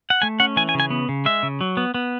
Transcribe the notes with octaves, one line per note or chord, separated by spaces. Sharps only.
F#5
A3 G#5
C#4 F#5
E3 G#5
G#5
C#3
G#5
B3
C#3
G#3 E5
C#3
F#3
B3
B3